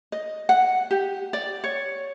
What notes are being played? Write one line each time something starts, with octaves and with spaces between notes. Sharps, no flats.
D#5
F#5
G4
D5
C#5